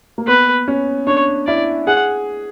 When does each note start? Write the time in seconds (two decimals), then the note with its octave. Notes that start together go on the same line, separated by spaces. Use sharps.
0.18 A#3
0.28 B3 B4
0.68 C#4
1.07 D4 C#5
1.47 E4 D5
1.87 G#4 F#5